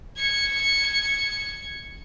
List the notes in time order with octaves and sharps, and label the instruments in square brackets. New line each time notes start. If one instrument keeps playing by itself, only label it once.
[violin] G#6 C#7